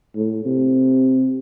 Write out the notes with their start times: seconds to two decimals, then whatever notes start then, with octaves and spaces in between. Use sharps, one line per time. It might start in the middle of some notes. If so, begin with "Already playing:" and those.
0.16 A2
0.45 C3